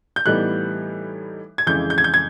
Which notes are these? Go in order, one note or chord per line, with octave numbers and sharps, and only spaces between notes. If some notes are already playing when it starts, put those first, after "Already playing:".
G6
A2 E3 G3 B3 D#4 F#6
G#6
F2 C#3 E3 G#3 G6
G6
G#6
G6
G#6